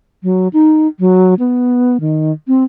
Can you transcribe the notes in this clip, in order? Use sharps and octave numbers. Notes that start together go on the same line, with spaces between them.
F#3
D#4
F#3
B3
D#3
C4